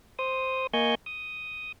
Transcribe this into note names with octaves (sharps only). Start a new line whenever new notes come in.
C5 D#6
A#3 D#5 G#5 C#6 G6
D#6